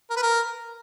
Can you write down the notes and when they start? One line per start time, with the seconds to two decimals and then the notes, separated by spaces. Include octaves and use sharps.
0.10 A#4
0.16 B4
0.23 A#4